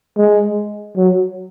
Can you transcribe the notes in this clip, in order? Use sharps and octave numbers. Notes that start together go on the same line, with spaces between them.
G#3
F#3